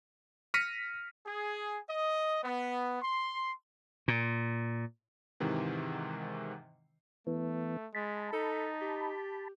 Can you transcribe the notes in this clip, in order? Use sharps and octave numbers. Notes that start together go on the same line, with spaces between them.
F6 A#6 B6 C#7 D#7
G#4
D#5
B3
C6
A#2
G#2 C3 D#3 E3
E3 A3 B3
G#3 A5 B5
D#4 A4
G4